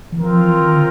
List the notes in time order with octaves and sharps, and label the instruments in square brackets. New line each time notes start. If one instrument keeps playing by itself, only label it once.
[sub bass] E3
[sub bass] F3 [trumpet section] C4 F4 A#4
[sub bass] E3
D#3
D3